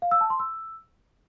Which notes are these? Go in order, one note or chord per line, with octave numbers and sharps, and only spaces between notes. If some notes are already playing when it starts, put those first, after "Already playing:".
F5
E6
A5
C6
E6